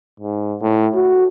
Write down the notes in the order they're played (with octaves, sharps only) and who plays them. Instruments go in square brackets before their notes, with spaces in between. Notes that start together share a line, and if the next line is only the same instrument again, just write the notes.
[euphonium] G#2
A2
F#4